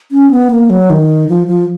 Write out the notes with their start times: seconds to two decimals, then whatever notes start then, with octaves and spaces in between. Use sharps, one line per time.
0.12 C#4
0.31 B3
0.51 A#3
0.70 F#3
0.90 D#3
1.29 F3
1.47 F3